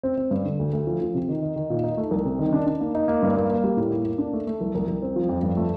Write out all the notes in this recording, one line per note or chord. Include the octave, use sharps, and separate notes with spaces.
C4
C4
G2
D3
D2
D2
F3
F3
C3
D#3
D#4
D#3
A#2
D#4
A3
C2
C3
D#3
D4
D4
A#3
D#4
A#3
G2
A#3
A#3
G3
A2
A#3
A#3
D4
A3
A3
C2
C2
C2
C4
F3
F2
G2
A3